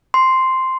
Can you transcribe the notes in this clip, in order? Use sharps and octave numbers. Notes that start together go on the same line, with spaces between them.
C6